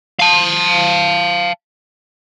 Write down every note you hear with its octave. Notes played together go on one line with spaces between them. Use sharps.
F5 A5